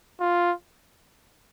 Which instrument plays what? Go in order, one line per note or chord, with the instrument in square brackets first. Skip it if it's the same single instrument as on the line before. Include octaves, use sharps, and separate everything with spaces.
[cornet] F4